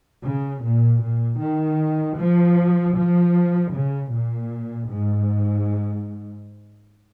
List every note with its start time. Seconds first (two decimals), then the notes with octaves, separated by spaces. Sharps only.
0.24 C#3
0.64 A#2
1.02 A#2
1.40 D#3
2.18 F3
2.96 F3
3.74 C#3
4.12 A#2
4.89 G#2